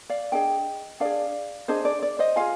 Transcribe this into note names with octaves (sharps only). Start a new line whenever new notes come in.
D5 F5
D4 G#4 D#5 G5
D4 G#4 D5 F5
D4 G#4 C5 D#5
D5
D5
C5 D#5
F4 G#4 F5 G#5